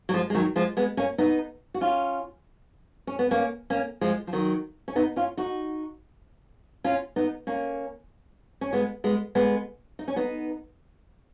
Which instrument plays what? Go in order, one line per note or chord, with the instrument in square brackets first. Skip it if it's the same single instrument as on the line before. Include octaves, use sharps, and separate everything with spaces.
[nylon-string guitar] F#3
F3 G#3
G#3
D#3 F#3
F3 G#3
G#3 B3
A#3 C#4
B3 D#4
F#4
C#4 F4
C#4
B3
A#3 C#4
A#3 C#4
F3 G#3
F3
D#3 F#3
C#4
B3 D#4
C#4 F4
D#4 F#4
C#4 F4
B3 D#4
A#3 C#4
C#4
G#3 B3
G#3 B3
G#3 B3
D#4
C#4
B3 D#4